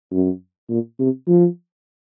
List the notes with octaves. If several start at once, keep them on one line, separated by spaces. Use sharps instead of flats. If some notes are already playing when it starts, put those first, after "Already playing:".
F#2
A#2
C3
F3